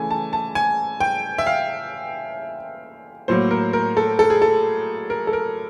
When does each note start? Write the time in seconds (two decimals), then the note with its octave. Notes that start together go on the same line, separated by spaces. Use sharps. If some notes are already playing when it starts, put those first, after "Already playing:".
Already playing: C#3 E3 A3 G#5 A5
0.11 A5
0.33 A5
0.55 G#5
1.00 G5
1.38 E5
1.46 F5
3.28 A2 F#3 A#3 C5
3.51 A#4
3.73 A#4
3.97 A4
4.19 A4
4.30 G#4
4.42 A4
5.10 A#4
5.27 A4
5.33 A#4